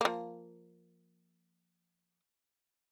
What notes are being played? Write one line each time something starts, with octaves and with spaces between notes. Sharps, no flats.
F3 A#3